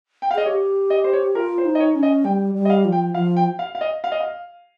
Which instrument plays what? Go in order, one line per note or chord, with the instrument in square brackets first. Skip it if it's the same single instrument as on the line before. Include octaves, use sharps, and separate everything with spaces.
[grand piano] G5
F5
[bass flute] G#4 [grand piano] D#5
[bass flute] G4 [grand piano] C#5
[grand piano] D#5
C5
C#5
[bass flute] F4 [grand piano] A#4
[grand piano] C5
[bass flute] D#4
[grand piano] D#5
C#5
[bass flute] C#4
[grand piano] D#5
[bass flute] G3 [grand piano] G5
[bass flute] G3
[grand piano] D#5
F5
[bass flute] F3
[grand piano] G5
[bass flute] F3 [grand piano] F5
[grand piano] G5
F5
F5
D#5
F5
D#5
F5